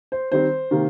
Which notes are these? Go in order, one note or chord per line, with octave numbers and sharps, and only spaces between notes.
C5
D#3 G3 C4 C5
C3 D#3 A#3